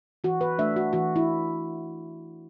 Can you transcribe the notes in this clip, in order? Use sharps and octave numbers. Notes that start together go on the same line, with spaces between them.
E3 F#4
B4
A3 D4 E5
F#4
E3 F#4
E4